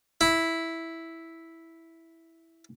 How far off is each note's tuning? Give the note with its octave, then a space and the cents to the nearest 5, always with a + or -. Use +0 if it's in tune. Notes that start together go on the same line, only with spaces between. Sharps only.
E4 -5